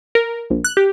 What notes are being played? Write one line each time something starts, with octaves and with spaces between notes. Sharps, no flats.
A#4
A#1
F#6
G4